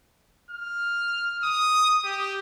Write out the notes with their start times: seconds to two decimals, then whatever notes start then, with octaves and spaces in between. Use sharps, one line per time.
0.51 F6
1.44 D#6
2.05 G4